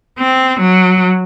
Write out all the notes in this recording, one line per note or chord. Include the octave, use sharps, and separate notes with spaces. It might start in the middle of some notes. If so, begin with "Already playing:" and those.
C4
F#3